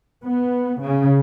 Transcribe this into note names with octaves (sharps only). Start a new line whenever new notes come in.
B3
C#3